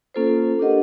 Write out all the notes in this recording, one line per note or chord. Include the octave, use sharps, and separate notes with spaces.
A#3 C#4 F4 A4 C5
D4 G4 A#4 D#5 F#5